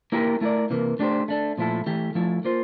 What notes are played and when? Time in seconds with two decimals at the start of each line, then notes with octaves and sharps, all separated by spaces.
0.12 A#3 E4 G4 A#4
0.41 A3 E4 A#4 D5
0.70 C3 E3 A#3
0.99 A3 D4 G4 C5
1.28 A3 D4 A4
1.58 A#2 F3 A3 E4 A4
1.86 E3 A3 E4 G4
2.15 F3 A3 E4 A4
2.45 A#3 F4 C5